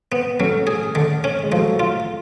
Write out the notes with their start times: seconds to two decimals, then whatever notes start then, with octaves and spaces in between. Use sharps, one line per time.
0.12 B3
0.39 F#3 A3 C#4
0.67 G#4
0.95 D3
1.24 C#4
1.43 G#3
1.51 F3 F#3 A3
1.80 F4